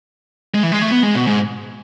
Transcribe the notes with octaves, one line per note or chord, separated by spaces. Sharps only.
G#3
E3
G#3
A3
B3
G#3
B2
G#2